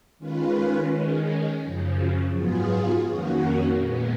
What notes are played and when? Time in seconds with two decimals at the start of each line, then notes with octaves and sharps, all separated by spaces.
0.19 D#3 G#3 C#4 F4 B4
0.90 D#3 G#3 C#4
1.62 F#2 C#3 F3
2.33 G#2 F#3 B3 F4 G#4
3.04 F2 D#3 A#3 C#4 F#4
3.76 A#2 G#3 B3